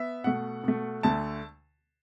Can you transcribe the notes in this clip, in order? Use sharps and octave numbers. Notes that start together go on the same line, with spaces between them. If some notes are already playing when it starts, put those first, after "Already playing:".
Already playing: B3 E5
B2 A3 F#5
B2 A3
D2 D3 A3 A5